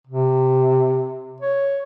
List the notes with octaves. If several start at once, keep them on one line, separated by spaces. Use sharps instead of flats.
C3
C#5